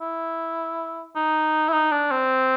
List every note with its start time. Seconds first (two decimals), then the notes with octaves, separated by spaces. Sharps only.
0.01 E4
1.16 D#4
1.69 E4
1.73 D#4
1.92 D4
2.11 C4